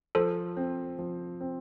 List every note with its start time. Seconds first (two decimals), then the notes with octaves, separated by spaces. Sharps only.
0.15 F3 A4 C5
0.57 C4
0.99 F3
1.41 C4